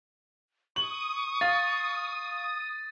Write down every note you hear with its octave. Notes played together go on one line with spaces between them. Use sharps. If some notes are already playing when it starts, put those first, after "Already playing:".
C#6 D#6 F#7
F5 A6